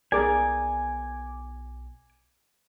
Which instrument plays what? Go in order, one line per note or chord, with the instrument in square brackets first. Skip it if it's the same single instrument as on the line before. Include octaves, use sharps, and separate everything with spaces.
[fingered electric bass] B1 B3 [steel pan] G#4 A#4 D5 [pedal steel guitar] G#5 D6